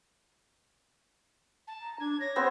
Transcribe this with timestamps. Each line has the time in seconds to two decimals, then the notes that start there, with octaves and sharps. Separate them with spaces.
1.67 A5
1.81 A#5
2.00 D4 G#6
2.20 C#5 A#6
2.36 B3 C4 C5